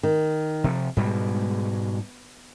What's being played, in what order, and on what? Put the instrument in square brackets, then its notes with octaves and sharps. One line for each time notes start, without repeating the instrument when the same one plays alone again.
[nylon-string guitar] D#3
[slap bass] C3 F3
[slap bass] G#2 G3 G#3 [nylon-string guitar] B2